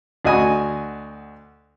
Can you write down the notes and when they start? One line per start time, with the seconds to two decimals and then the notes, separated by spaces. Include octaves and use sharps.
0.25 D2 F#4 D#5 G#5 B5 D#6